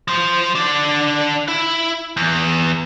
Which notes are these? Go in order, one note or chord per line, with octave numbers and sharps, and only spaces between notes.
F3 C5
D3 D4
E4
E2